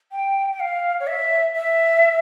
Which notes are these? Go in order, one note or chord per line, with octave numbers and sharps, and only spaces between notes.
G5
G5
F5
C#5
E5
E5